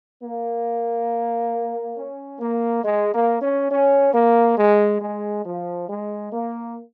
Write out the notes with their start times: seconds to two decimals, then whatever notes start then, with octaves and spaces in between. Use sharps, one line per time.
0.23 A#3
1.97 C#4
2.40 A#3
2.84 G#3
3.14 A#3
3.42 C#4
3.71 C#4
4.14 A#3
4.58 G#3
5.01 G#3
5.46 F3
5.89 G#3
6.33 A#3